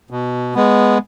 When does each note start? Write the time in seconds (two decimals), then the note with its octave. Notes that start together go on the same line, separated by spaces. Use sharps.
0.11 B2
0.54 G#3 B3